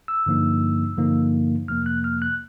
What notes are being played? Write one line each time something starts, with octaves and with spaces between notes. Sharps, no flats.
E6
G2 D3 F3 A#3 D#4
G2 D3 F3 A#3 D#4
F2 C3 F3 A#3 F6
F#6
F6
F#6